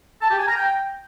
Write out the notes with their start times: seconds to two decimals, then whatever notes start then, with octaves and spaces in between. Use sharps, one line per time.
0.21 A5
0.30 G4
0.39 G#5
0.48 A#5
0.56 G5